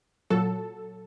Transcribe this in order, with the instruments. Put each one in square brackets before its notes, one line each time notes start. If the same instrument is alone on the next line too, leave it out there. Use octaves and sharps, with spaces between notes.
[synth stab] A#2 F#3 A4